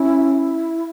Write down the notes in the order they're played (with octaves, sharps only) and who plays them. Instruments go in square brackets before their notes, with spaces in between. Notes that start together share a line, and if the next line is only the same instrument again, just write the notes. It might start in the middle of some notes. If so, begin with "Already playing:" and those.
Already playing: [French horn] C#4 [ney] E4